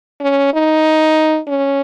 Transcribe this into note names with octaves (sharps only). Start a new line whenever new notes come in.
C#4
D#4
C#4